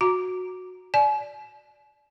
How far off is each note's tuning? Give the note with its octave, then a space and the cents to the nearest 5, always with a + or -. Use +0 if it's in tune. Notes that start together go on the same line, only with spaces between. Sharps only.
F#4 -10 A#5 +0
D5 +0 G#5 +40